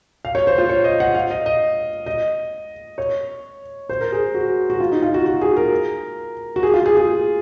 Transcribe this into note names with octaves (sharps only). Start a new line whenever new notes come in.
F5
C#5
C5
F4
C#5
D#5
F#5
F5
D#5
D#5
D#5
C#5
C5
A#4
G#4
F#4
F#4
F4
D#4
F4
F#4
F#4
G#4
A#4
F#4
G#4
F4
G#4
G#4